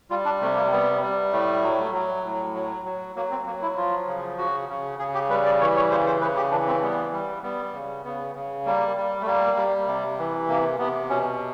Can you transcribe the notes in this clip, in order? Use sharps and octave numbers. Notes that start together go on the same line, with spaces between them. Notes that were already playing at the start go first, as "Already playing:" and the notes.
G3 F4
D4
C3 A3
A#3
G3 B3
G3
A2 A3
F#3
F#3
A2
F#3
F#3
F#3 A#3
C4
F#3 A#3
E4
F3 F4
C#3
C#3 F#4
C#3
C#3 G#4
G4
G3 B4
D5
E3 C#5
C#5
C#3 C5
C5
C#3 B4
G4
E3 D4
C4
G3 B3
G3
G3 B3
C#3
C#3 B3
C#3
G3 A#3
G3
A3
G3 A#3
G3
C3
E3
C3 A#3
C3 B3
B2 C#4